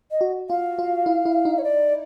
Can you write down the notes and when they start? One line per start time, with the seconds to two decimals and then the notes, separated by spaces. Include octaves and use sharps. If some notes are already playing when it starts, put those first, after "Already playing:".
0.11 D#5
0.21 F#4
0.50 F4 F5
0.79 F4
1.06 E4
1.25 E4
1.45 D#4
1.59 C#5
1.64 D5